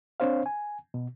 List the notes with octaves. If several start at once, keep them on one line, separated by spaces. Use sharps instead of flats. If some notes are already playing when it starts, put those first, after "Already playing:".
C4 D4 C5 C#5 F5
G#5
B2